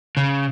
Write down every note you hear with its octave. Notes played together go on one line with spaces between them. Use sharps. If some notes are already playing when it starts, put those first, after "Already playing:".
C#3